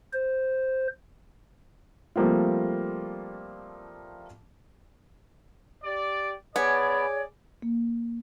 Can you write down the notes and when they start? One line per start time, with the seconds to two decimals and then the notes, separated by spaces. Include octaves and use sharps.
0.13 C5
2.16 F3 G3 A3 A#3 C4 F4
5.84 G4 D5
6.56 B3 G#4 C#5 D5 G#5
7.62 A#3